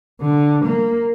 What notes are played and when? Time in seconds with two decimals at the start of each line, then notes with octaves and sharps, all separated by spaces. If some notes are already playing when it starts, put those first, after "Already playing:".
0.21 D3
0.65 A#3